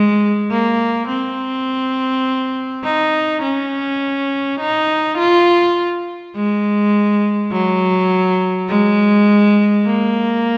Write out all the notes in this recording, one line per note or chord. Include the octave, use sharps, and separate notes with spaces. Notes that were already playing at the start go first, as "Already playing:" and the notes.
Already playing: G#3
A#3
C4
D#4
C#4
D#4
F4
G#3
F#3
G#3
A#3